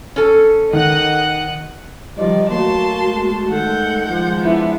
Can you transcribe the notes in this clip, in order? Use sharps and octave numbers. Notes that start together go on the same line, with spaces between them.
C#4 A4
D#3 D#5 F#5 F#6
D#3 F3 G3 D5 D#5
F#3 A3 A#3 F#4 A5 C6
G#3 A3
D#3 A4 F#5 G6
F3 G#3 F4
B3 D4 E4 E5